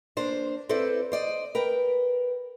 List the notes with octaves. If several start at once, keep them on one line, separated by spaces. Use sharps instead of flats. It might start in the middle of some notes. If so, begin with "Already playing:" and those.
A#3 D4 C5
C4 E4 A4 B4 C5 D5
C5 D5 D#5
A#4 B4 G5